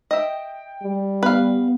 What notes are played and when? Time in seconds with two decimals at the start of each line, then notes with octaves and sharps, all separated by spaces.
0.11 D#5 E5 G5
0.83 G3
1.23 B3 B4 F5